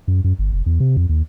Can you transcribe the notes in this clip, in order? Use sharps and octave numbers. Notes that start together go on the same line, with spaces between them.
F#2
F#2
G1
F1
E2
C3
F2
D#2